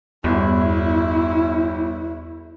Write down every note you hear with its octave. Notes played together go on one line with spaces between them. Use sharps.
G1 E2 B2 E4